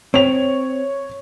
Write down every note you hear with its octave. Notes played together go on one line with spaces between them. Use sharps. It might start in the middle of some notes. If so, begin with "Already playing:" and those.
C4 C#5 F7